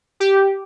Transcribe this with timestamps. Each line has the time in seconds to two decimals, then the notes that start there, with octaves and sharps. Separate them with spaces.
0.20 G4